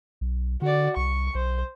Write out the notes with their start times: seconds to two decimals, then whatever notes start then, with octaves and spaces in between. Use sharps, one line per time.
0.21 B1
0.62 D3 F#4 D5
0.97 C2 C#6
1.35 B1 C5